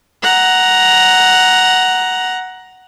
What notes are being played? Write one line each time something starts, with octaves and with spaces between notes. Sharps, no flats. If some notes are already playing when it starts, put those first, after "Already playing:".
F#5 A#5